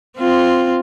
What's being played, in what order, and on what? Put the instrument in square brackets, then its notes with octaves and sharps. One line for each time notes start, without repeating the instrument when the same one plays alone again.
[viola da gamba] C4 F4